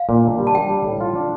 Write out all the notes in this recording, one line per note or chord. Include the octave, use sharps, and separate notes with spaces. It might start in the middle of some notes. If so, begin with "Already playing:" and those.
Already playing: F5
A#2
D4
G3
A5
D4 G5
G3
A2
F4
D4